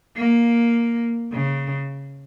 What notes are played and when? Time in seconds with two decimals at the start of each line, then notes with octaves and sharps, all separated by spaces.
0.17 A#3
1.32 C#3